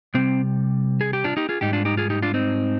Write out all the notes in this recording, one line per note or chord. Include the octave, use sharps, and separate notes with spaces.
C3 G3 C4
G#4
G4
D4 F4
D#4 G4
F4 G#4
G#2 G3 D#4 G4
D4 F4
D#4 G4
F4 G#4
D#4 G4
D4 F4
C4 D#4